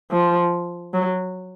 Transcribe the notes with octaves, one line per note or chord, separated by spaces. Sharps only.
F3
F#3